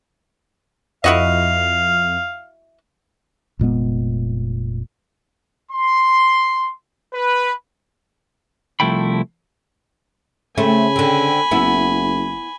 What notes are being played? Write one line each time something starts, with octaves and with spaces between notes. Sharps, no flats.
F2 E4 F#4 D#5 F5
F1 A#2 G#3 B3
C6
B4
C2 F3 A3 E4 G5 B5
C#3 A3 C4 G#5 B5
D3 C4
F#1 B3 E4